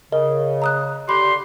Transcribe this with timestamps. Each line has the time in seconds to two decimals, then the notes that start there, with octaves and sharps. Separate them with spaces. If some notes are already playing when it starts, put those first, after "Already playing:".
0.12 C#3 A#4 D#5
0.62 A#5 D#6 F#6
1.09 D3 G4 B5 C6